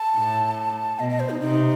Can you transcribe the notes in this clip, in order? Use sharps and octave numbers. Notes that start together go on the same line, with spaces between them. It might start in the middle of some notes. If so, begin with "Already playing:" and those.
Already playing: A5
A2
B2 D#5
D#5
C5
D#4
C3 D#4